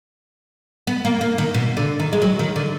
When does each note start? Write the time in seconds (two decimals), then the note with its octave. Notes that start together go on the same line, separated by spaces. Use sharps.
0.87 B3
1.05 A#3
1.21 A#3
1.38 D#3
1.54 B2
1.77 D3
2.00 D#3
2.13 G#3
2.22 F#3
2.39 D#3
2.56 D3